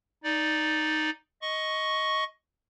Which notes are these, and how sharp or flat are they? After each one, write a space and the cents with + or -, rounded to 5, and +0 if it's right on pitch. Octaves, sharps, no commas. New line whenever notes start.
D#4 +0 D5 +0
D#5 +10 C#6 +0